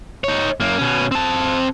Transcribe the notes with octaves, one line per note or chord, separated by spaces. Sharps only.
D#4 C#5
F#2 A#3
B2 C#4
C4 A5